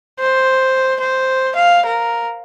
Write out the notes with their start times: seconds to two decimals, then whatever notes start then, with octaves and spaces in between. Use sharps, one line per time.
0.20 C5
1.00 C5
1.55 F5
1.86 A#4